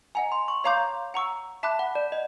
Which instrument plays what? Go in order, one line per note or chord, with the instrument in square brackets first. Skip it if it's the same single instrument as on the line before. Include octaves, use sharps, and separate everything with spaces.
[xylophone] D#5 F#5 A#5 [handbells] G#5
[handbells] C6
C#6
[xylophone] C#5 F5 A#5 D6 G6 [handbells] C6
[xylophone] F#5 A#5 C#6 E6
[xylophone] E5 A5 D6 F#6 [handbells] B5
[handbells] F#5
D5
D#5